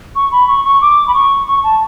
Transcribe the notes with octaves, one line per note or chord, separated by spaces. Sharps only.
C#6
B5
C#6
C#6
D6
B5
C#6
C#6
A5